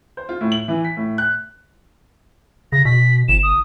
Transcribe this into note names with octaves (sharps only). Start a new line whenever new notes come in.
C5
F4
A2
F#7
E3
B6
A2
F#6
C#3 A#6
B2 B6
G1 E7
D#6